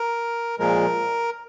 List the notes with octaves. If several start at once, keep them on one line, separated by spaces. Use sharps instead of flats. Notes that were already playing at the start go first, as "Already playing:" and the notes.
Already playing: A#4
A#2 F3 G#3 A#4